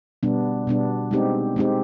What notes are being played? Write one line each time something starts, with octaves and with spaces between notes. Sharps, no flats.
B2 G3 B3 D4
B2 G3 B3 D4
G#3 C4 D#4 G4
G#3 C4 D#4 G4